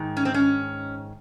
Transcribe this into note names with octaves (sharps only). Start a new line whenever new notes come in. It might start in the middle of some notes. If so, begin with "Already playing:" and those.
Already playing: G#2 D#3
C#4
C4
C#4